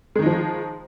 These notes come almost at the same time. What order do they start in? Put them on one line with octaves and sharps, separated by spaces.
G#3 D#3 D#4 F3